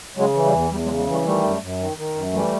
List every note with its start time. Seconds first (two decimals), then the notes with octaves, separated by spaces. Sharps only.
0.16 C#3 F#3 G#3
0.34 E3
0.45 G3
0.53 E2
0.71 E2 G3
0.85 F#3 G#3
0.89 C#3
0.98 F#3 G#3
1.07 E3 G3 A3
1.25 D#3 G3 A3
1.44 F#2
1.61 F#2
1.79 D#3
1.97 D#3
2.16 F#2
2.33 E3 G3 A3